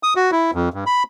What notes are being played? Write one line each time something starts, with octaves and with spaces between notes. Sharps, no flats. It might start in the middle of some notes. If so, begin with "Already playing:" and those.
D#6
F#4
E4
F2
G2
B5